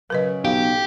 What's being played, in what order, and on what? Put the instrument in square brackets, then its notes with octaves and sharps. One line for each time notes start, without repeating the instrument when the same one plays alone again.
[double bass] C#3 F#3 [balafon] A#4 B4 D#5
[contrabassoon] B1 [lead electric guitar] G4 [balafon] F5